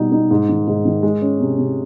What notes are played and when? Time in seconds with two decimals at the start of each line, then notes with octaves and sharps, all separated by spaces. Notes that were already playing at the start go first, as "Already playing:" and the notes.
Already playing: B2 G3 D#4
0.12 D#4
0.31 G#2
0.49 D#3
0.67 G#2
0.85 D#3
1.03 G#3
1.22 C#4
1.40 C3
1.58 C3